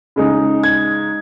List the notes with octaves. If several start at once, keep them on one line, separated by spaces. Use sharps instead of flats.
C#3 G#3 D#4
G#6